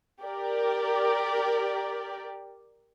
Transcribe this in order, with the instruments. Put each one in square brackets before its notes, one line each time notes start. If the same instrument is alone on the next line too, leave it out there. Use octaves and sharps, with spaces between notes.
[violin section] G4 A#4 D5